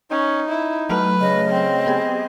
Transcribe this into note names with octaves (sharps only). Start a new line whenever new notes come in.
C#4 D#4
E4
F#3 A3 B4 F6
C#3 D#5
C4
B3 G4 G#4